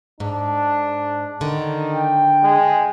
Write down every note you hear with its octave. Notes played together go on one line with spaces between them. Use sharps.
G#2 D4
D3 D#3
G5
G#3